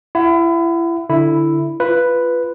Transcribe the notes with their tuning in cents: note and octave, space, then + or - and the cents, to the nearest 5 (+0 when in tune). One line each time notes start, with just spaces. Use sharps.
E4 +30 F#5 +0
D3 +0 E4 +0
F4 -15 B4 +0